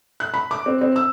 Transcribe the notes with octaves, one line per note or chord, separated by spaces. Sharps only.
F#6
B5
D6
C4
C4
E6